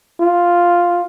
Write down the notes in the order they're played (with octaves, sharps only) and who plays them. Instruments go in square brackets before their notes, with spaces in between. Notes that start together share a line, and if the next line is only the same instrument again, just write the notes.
[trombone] F4